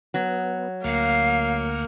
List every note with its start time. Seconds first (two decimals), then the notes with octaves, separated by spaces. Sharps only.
0.14 F#3 B3
0.84 D2 A#3 F5 F#5 F6